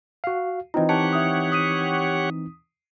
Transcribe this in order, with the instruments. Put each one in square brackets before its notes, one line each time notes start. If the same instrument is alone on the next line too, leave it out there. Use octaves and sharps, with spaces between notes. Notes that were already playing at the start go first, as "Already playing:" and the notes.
[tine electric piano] F#4 F5
[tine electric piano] E3 C4 D#4 [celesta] F4 D#5
[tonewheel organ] G4 C#5 F#5 [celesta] A5
[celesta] E5 D#6
D#6 B6 D#7